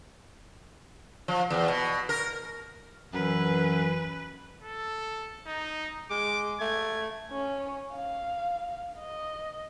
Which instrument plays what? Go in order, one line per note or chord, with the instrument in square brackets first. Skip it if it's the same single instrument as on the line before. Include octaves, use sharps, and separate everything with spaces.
[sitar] F3
E2
B2
A#4
[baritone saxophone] F#2 [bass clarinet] E3 [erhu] B4
[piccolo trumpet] A4
D#4
[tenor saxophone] G#3 [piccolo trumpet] D6
[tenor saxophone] A3 [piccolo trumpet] G#6
[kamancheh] C#4
F5
D#5